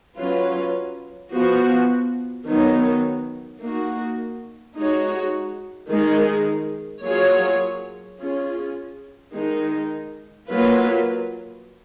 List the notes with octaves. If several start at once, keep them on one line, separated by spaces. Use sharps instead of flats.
F#3 C#4 F4 B4
F3 B3 F#4
D#3 F#3 B3 D#4
A#3 D#4 F#4
G#3 D#4 F#4 C#5
D#3 G#3 D#4 G#4
F#3 A#3 F4 G#4 C#5
C#4 F4 G#4
D#3 G#3 D#4
F#3 A#3 F4 B4